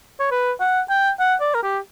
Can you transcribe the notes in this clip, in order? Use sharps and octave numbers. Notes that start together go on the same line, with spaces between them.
C#5
B4
F#5
G5
F#5
D5
A#4
G4